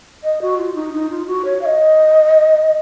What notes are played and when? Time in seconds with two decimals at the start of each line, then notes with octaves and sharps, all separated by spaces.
0.24 D#5
0.42 F#4
0.58 F4
0.75 D#4
0.93 D#4
1.10 F4
1.27 F#4
1.45 C#5
1.61 F5
1.65 D#5